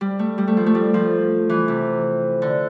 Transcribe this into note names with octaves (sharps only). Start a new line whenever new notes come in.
G3
A3
G3
A3
F3
A3
G3
F3
E3
C3
D3